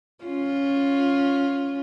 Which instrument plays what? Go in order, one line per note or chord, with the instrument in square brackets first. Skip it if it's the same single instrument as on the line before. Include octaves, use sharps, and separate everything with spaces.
[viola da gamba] C#4 F4